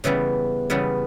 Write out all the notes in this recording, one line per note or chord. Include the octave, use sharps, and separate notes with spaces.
C#3 E3 G3 B3
C#3 E3 G3 B3